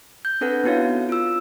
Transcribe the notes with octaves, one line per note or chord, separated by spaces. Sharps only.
G6
C4 D4 A4 B4 F#5
B3 D#4 E4 F#4 C#5 F5
F4 E6